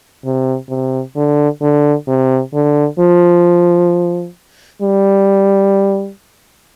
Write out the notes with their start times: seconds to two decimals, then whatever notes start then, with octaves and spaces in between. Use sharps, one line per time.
0.25 C3
0.69 C3
1.16 D3
1.62 D3
2.08 C3
2.54 D3
2.99 F3
4.82 G3